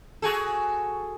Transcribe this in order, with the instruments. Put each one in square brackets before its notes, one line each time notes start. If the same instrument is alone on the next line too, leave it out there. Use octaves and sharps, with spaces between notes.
[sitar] F#4 G#4 A4